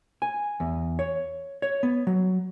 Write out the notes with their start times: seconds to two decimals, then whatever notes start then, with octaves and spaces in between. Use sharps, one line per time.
0.22 G#5
0.60 E2
0.99 C#5
1.62 C#5
1.83 B3
2.07 F#3